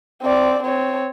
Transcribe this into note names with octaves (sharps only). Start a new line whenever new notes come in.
C4 D5
C4 C#5